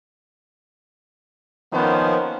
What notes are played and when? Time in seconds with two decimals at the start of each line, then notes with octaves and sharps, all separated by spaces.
1.73 D#3 F3 A#3 B3 C#4 C5